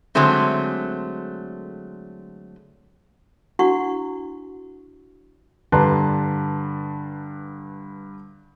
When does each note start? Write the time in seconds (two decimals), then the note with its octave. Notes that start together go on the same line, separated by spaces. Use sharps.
0.15 D3 F#3 G#3 A3 C4
3.59 D4 E4 F#4 F#5 C#6
5.72 G2 D3 B4 A5 A#5 C6